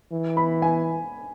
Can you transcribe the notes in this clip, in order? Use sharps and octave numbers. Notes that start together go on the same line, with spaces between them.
E3
B5
G#5